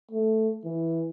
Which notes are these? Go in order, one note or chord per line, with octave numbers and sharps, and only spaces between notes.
A3
E3